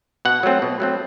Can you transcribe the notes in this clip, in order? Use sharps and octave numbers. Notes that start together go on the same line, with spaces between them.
B2 F#5
F#3 A3 C4
B2
F#3 A3 C4